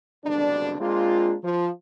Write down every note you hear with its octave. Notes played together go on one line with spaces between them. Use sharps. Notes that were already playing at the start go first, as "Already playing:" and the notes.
F#1 F2 B2 D3 G3 D4
G#3 A#3 C4 D4 F4
F3